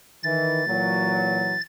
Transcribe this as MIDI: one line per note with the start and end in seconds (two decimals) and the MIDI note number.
0.23 0.62 51
0.23 0.62 52
0.23 1.61 93
0.67 1.56 46
0.67 1.56 52
0.67 1.56 54